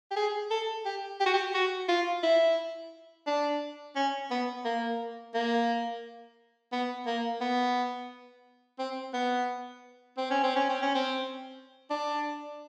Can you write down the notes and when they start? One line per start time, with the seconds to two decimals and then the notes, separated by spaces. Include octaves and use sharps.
0.11 G4
0.16 G#4
0.51 A4
0.85 G4
1.20 G4
1.26 F#4
1.34 G4
1.54 F#4
1.88 F4
2.23 E4
3.27 D4
3.96 C#4
4.30 B3
4.65 A#3
5.34 A#3
6.72 B3
7.06 A#3
7.41 B3
8.79 C4
9.14 B3
10.17 C4
10.30 C#4
10.43 C4
10.56 C#4
10.69 C4
10.82 C#4
10.95 C4
11.90 D4